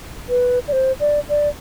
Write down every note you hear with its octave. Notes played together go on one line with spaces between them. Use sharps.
B4
D5
C5
D5
D5